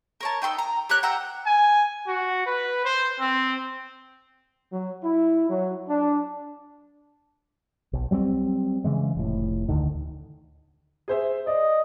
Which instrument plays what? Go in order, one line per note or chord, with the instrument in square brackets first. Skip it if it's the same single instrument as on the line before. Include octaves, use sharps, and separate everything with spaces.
[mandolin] A#4 C#5 A5
D#4 G5 C6 E6
A#5
G4 A#4 C#5 F#6
F#5 G5 A#5 E6
[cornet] G#5
F#4
B4
C5
C4
[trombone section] F#3
E4
F#3
D4
[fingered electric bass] B1
F#3 G3 B3 C4
C#3 E3 G#3
F1 A2
D2 D3 D#3
[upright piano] G#4 C5 E5
[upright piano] D5 [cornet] D#5